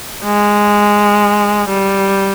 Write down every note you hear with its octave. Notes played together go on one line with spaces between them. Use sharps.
G#3
G3